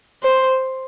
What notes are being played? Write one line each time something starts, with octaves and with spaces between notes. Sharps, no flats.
C5